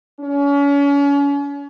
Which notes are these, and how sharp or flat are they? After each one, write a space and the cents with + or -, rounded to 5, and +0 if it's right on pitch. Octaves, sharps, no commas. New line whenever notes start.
C#4 +35